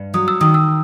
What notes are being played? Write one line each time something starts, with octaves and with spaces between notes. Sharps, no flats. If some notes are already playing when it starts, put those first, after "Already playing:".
Already playing: G2
F#3 D#6
E6
D#3 D#6
E6